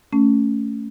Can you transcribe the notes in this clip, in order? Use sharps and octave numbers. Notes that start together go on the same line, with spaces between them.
A3 C#4